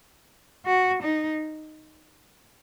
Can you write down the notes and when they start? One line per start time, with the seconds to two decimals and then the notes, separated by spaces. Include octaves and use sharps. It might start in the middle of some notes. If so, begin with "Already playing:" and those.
0.66 F#4
1.02 D#4